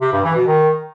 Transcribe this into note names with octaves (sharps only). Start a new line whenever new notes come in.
C3
G2
E3
B2
D#3